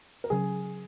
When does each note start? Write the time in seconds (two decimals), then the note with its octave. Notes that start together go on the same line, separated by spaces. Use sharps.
0.24 A#4
0.30 C#3 F#3 C#4 G#4